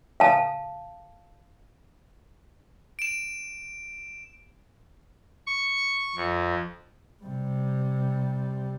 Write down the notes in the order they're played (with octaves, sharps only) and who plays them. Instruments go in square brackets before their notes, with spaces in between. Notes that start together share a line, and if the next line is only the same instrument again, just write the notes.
[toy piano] F5 A5
[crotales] D7 E7
[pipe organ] C#6
F2
[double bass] C3 G3